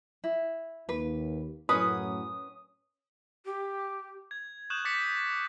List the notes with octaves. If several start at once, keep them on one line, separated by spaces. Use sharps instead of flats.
E4
D#2 B4
F#2 A2 F#3 C#4 B4 D#6
G4
G#6
C#6 D#6 F#6 G6 E7 F#7
D6 A6 B6 C#7